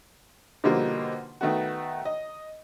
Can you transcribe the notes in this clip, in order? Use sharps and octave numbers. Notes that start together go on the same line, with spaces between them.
B2 D3 F3 G3 A#3 D#4
D#3 A3 B3 F#4
D#5